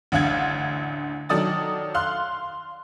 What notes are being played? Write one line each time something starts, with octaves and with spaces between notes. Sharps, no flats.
A1 D2 D4 F5 F#5 G#6
D#3 F#3 A4 D5 D#6 A6
F5 C6 F6 F#6